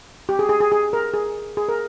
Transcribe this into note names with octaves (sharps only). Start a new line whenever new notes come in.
G4
G#4
G#4
G#4
G#4
A#4
G#4
G#4
A#4